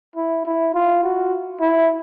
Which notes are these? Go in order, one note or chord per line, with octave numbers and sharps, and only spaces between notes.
E4
E4
F4
F#4
E4